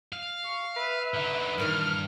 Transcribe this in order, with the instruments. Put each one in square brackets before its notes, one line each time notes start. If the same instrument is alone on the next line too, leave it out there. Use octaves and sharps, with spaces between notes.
[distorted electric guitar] F5
[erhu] C#6
[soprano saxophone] B4 [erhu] E5
[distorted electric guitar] D3 D#4
[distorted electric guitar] G2 [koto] A#2 D#3 E3 [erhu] F6